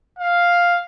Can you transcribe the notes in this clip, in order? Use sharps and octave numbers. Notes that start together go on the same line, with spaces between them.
F5